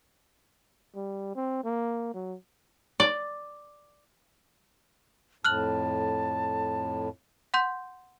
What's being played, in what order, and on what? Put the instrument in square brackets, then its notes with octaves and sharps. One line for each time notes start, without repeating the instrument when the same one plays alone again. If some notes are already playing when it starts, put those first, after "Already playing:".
[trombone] G3
C4
A#3
F#3
[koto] D5
[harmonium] F2 A2 [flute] A5 [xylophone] F6 F#6 F#7
[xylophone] F#5 C6 G6